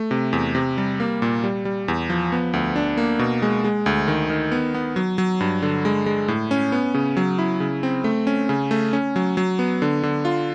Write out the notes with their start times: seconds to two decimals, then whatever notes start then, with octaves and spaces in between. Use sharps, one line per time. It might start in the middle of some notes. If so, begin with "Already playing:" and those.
Already playing: A3
0.11 C3
0.33 E2
0.55 C3
0.78 G3
1.00 A#3
1.22 A#2
1.44 G3
1.65 G3
1.88 E2
2.10 F3
2.32 B3
2.53 D2
2.76 D4
2.97 A#3
3.19 B2
3.42 G#3
3.64 G#3
3.86 D2
4.08 D#3
4.30 D#3
4.52 B3
4.74 B3
4.96 F#3
5.18 F#3
5.40 G2
5.62 D3
5.85 G#3
6.06 G#3
6.28 A2
6.51 C#4
6.72 B3
6.94 C#3
7.17 F#3
7.39 E4
7.60 C#3
7.83 C4
8.04 A3
8.27 C#4
8.49 C#3
8.71 A3
8.93 C#4
9.16 F#3
9.37 F#3
9.59 B3
9.82 D3
10.03 D3
10.25 F4